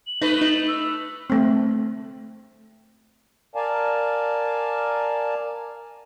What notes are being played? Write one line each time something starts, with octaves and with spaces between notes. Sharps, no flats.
F#7
A3 D#4 B4
D#4
E6
A3 C4
A#4 D5 F5 G#5 A5